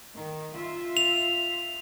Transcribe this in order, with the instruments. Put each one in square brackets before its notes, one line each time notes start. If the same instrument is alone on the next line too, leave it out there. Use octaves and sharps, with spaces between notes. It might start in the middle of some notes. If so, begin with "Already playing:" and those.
[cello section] D#3
F4 E5
[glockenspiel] F7